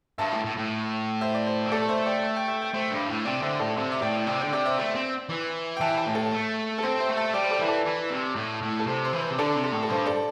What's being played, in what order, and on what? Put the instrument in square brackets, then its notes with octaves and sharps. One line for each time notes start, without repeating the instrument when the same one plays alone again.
[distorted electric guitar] G2 [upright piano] E5 A5
[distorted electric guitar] A2
A2
A2
[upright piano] C5 E5
D5
C5
[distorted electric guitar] C4
[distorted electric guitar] A3 [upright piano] A4 D5
[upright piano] C5 E5
D5 G5
E5
G5
E5
G5
[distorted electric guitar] A3 [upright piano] C5 E5
[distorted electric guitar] G2
A2
[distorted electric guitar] C3 [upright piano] D5 G5
[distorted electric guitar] D3 [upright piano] C5 E5
[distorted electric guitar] A2 [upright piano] A4 D5
[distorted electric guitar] C3 [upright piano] C5 E5
[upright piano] E5
[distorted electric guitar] A2 [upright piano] D5 G5
[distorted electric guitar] C3 [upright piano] D5 G5
[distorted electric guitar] D3 [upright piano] D5 G5
[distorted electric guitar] C3 [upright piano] D5 G5
[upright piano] C5 E5
[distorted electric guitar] A3 [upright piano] C5 E5
[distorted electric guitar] C4
E3
[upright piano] G5
[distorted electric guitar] E3 [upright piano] E5 A5
[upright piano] E5 A5
[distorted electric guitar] A2
[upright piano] A4
[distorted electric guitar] A3
[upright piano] A4
[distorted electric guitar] C4 [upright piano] C5
[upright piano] C5 E5
[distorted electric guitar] A3
[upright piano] E5 A5
[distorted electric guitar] G3 [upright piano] D5 G5
[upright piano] C5
A4 D5
[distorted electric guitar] E3 [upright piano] E5
[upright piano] A4 D5
[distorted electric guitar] E3
C3
A2
A2
[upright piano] A4
[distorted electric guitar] C3 [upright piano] C5
[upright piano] C5
[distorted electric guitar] E3
[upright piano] C5
[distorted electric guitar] C3
[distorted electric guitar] D3 [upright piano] A4 D5
[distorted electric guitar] C3
[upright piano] A4
[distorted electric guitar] A2
[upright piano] A4
[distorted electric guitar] G2 [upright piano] C5
[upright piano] A4 D5